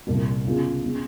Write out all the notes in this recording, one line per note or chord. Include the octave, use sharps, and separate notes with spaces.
C2 A#2 G3
C#2 B2 G#3 C#4 F4
B2 G#3 C#4